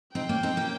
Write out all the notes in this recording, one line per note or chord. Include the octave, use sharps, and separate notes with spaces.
C4 D#4 G5
A#3 C#4
C4 D#4
A#3 C#4